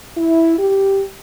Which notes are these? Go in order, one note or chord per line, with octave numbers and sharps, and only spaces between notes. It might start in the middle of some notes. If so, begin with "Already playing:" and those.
E4
G4